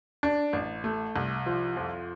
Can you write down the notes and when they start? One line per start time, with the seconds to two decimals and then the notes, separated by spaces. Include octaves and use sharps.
0.23 D4
0.53 A1
0.84 A3
1.16 C2
1.46 F3
1.77 F2